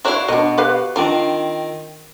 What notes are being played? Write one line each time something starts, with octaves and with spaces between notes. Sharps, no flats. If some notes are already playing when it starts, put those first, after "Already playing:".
D4 E4 F#4 C#5 F5
B2 D4 D#5
G4 B4 F5
D#3 C4 D4 F4